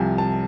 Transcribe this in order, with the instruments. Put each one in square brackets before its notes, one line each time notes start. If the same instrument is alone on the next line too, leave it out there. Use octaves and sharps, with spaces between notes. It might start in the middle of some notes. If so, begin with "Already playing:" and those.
Already playing: [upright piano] C2 C3 F3 G#5
A5